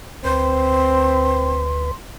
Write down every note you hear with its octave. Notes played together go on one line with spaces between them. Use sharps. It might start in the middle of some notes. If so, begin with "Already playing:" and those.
D2 C4 B4 C6